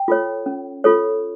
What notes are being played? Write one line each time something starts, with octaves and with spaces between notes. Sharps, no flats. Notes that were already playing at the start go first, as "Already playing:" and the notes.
Already playing: G5
F4 A4 C#5
C#4
F4 A4 C#5